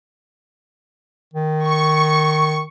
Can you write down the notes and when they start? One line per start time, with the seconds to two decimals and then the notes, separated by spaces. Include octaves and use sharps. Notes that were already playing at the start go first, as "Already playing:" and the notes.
1.34 D#3
1.68 C#6